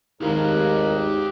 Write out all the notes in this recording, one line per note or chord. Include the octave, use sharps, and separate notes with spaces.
G#1 D#2 G4 A#4 F5